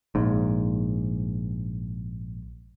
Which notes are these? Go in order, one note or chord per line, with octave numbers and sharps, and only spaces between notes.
A#1 G#2